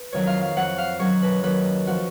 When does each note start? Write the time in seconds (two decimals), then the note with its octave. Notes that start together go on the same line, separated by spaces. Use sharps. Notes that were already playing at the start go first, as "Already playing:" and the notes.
Already playing: B4
0.12 F2 D#3 F#3 C#5
0.27 F5
0.42 F5
0.56 F2 F3 F#5
0.78 F5
0.99 F#2 D#3 F#3 C#5
1.22 B4
1.43 D#2 D#3 F#3 B4
1.87 F3 F#4